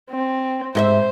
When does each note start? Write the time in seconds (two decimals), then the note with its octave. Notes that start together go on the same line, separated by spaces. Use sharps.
0.10 C4
0.75 G#2 C5 D#5 E5